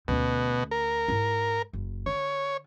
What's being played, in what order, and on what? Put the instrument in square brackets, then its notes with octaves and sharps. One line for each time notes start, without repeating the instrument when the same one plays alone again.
[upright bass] D2 C#4 [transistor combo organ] B2
[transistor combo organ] A#4
[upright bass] G#2 E4
F#1
[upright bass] D3 [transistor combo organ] C#5